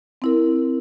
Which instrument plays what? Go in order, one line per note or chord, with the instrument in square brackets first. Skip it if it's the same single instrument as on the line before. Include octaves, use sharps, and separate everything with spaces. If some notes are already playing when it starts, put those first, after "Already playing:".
[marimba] C4 E4 A#4